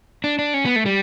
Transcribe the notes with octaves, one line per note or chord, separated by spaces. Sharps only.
D4
D4
C#4
B3
A3
G3